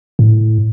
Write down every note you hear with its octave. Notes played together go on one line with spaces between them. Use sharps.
A2